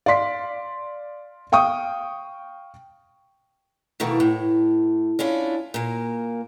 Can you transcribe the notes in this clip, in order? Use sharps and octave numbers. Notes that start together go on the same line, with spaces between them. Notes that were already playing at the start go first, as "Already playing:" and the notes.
D5 F5 C6 B6
F5 G5 C#6 D#6
B2 D#3 E3 A3 A#3
A2
C#4 D4 E4 F4
A#2 A#3